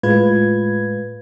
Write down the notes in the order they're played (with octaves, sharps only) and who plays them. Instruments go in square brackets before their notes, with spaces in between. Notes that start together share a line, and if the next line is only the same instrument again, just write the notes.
[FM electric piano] A2 G#3 F4 B4 G#6